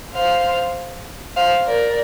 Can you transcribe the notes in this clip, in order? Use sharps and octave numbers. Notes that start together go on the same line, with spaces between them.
C5 F5
C5 F5
A#4 D5